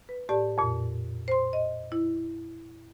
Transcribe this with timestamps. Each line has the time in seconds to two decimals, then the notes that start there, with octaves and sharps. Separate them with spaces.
0.09 B4
0.29 A2 G4 D5 A5
0.58 F2 A#2
1.28 C5 C6
1.53 D#5
1.92 E4